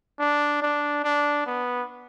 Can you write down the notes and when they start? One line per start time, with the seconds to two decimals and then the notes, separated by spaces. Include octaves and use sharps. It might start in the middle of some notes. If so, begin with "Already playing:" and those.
0.19 D4
0.62 D4
1.04 D4
1.46 B3